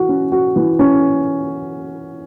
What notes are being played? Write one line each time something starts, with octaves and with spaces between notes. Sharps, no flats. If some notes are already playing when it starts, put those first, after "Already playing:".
Already playing: E3 F#4
C#4
F#4
E3
C#4